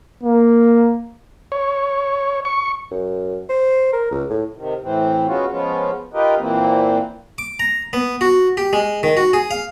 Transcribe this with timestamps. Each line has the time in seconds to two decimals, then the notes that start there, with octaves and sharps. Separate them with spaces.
0.23 A#3
1.52 C#5
2.45 C#6
2.91 F#2
3.49 C5
3.93 A#4
4.11 C#2
4.30 A2
4.56 C3 D#3
4.82 A2 E3 C4
5.27 G#3 B3 C#4 F4 F#4
5.50 F3 G#3 B3 C#4 F4
6.14 D#4 F4 G4 A#4 B4 D#5
6.38 A#2 E3 A#3 C4
7.38 D6
7.60 A#5
7.93 B3
8.21 F#4
8.57 G4
8.73 G#3
9.03 D#3
9.17 F#4
9.33 G#4
9.51 F5